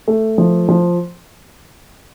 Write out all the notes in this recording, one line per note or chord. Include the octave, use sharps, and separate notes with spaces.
A3
F3
F3